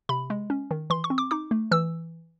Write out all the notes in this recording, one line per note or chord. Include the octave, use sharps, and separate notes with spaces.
C3 B5
G#3
C#4
D#3
E3 C6
C#6
C4
D6
D#4 D6
A3
E3 E6